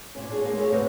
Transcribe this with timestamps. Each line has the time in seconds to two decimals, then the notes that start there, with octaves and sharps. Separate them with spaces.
0.15 A#2 C#4
0.30 D4 G#4 C#5
0.44 G#3 A#3 C#4
0.59 A3 A#3 G#4 C#5
0.72 D2 C3 B3 C4 D#4 C#5